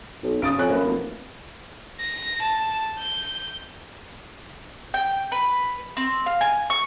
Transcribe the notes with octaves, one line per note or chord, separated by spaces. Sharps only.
B1
C#3 D#6 A6 D7
F2 C#5 G#5 F#6
F#2 A#3 B4
F1
A#6
A5
G6
G5
B4
C4
F5
G#5
C#6